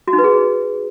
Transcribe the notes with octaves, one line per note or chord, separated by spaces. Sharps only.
F#4
D#4
B4
G#4